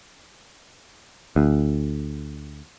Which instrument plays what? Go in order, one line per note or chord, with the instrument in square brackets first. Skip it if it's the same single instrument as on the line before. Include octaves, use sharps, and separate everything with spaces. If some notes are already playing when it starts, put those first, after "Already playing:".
[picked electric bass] D2